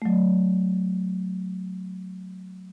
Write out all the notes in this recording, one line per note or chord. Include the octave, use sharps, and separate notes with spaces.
F#3 A3